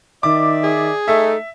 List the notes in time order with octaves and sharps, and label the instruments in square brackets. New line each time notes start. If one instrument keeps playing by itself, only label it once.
[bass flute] D#3 [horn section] D5 E5 [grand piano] D6
[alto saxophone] G#4
[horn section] A3 D#4 [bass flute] A4 [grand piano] E5